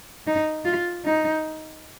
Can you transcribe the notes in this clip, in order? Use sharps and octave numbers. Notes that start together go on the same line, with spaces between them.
D#4
F4
D#4